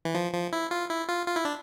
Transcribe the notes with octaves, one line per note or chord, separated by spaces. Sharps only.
E3
F3
F3
E4
F4
E4
F4
F4
E4
D4